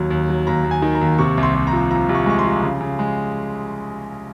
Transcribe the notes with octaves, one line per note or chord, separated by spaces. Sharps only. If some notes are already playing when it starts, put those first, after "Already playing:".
Already playing: D#2 F#3
D#2
F#3
D#2 A#5
D#2
G#5
D#3
A#5
D#2
C3 C#6
C2
C6
C2
A#5
F3
F3 A#5
C2
C#6
G#3 C#6
C6
F3
C#3
C#3
G#3